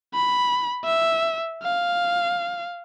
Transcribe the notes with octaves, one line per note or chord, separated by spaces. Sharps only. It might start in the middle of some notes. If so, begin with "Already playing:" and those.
B5
E5
F5